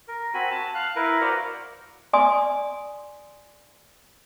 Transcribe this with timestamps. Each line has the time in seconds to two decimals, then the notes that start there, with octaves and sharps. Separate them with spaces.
0.08 A#4
0.34 C4 F#4 G#5 B5
0.51 A5
0.75 F5 F#6
0.96 E4 A#4 B4
1.21 F#4 A#4 C5 D5 F5 F#5
2.13 D5 G#5 C6 D#6